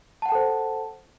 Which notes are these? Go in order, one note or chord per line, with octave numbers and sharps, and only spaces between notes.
A4 C5 F#5 G5 A5